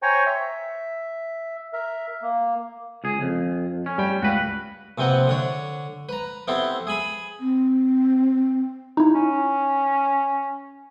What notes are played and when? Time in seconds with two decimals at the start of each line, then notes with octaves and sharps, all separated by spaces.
0.02 C5 C#5 G5 G#5 A#5 C#6
0.26 E5
1.73 A#4 E5
2.22 A#3
3.04 C#2 G#4
3.21 F2
3.86 C#4
3.98 G3 G5
4.22 C#2 F#4 B4
4.98 A#1 C3 C4 B4 F#5
5.27 D3 D4 C#5
6.09 B4 A#5
6.48 B3 C4 E4 G4 A4 C5
6.87 G#4 G#5 B5
7.40 C4
8.97 D#4 E4
9.14 C#4